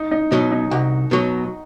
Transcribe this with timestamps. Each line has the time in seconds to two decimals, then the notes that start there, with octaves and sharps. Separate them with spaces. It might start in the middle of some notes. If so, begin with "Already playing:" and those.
Already playing: D#4
0.11 D#4
0.31 B2 F#3 D#4
0.51 D#4
0.71 C2 F#4
1.11 B2 F#3